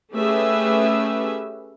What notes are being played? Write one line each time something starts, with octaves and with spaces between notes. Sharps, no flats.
A3 C#4 G4 G#4 B4 E5